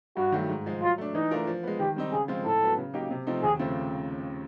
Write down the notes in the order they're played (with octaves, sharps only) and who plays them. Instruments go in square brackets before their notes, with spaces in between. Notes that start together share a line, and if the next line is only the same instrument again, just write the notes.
[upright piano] G2 [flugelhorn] F#4
[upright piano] D#3 F#3 A3
G#2
F3 G#3
[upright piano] F#3 [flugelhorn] F4
[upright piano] A3 D4
[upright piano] E3 [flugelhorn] D#4
[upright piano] A3 D4 F4 A#4
F3
G#3 B3
[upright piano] D#3 [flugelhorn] G4
[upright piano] G3 C4 D#4
[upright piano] C#3 [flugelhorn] G#4
[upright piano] F3 G#3 C4 F4
[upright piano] A2 [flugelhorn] A4
[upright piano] F#3 B3
C#3
F#3 A#3 D#4 G4
C3
F3 A3 C4 D#4
[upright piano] D#2 [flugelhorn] G#4
[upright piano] C#3 F3 A3 C4